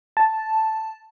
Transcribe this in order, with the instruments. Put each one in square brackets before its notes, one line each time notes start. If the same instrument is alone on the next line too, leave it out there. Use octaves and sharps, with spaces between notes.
[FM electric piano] A5